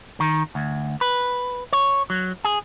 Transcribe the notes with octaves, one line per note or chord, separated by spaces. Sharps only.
D#3
D2
B4
C#5
F#3
G#4